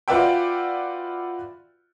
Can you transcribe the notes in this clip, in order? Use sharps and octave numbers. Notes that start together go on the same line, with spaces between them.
F4 F#4 B4 D5 E5 G5